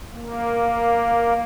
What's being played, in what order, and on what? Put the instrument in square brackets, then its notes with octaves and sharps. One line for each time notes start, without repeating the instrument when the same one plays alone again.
[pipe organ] A#3